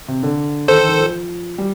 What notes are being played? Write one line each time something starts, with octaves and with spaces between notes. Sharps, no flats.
C3
D3
D#3 A4 C5
D#3
D#3
F3
G3